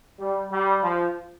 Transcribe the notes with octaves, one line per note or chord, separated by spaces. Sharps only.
G3
G3
F3